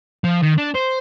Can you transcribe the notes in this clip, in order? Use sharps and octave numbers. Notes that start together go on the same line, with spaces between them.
F3
D#3
D4
C5